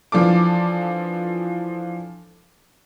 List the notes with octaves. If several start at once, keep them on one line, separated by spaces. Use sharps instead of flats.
E3 F3 D4 A4 D6